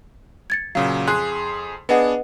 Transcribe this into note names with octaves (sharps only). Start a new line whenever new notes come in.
G#6 A6 C#7
A#2 C#3 F#3 F5
F2 G#4 C6 F#6
B3 D4 G#4 B4 D#5 F#5